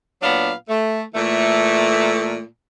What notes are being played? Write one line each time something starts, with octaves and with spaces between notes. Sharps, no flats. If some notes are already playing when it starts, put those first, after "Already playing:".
A#2 F#3 B3 D4 F5
A3
A#2 E3 A3